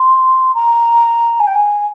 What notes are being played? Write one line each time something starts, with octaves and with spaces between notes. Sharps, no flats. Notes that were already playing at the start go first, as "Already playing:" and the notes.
Already playing: C6
A#5
G#5
G5
G#5